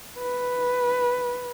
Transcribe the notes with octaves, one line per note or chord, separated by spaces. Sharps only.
B4